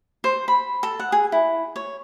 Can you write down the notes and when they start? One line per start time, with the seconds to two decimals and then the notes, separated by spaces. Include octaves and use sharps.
0.24 C5
0.48 B5
0.83 A4
1.00 F#5
1.12 G#4
1.32 E4
1.76 C#5